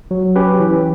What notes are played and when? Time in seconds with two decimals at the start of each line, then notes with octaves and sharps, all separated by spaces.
0.11 F#3
0.36 C#4 G4 B4
0.60 E3